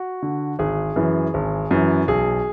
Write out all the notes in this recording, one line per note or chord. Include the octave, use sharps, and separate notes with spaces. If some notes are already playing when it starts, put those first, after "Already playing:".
Already playing: F#4
D3
G#1 G#4
F#2 E3
G#1
F#2 E3
B1 G#4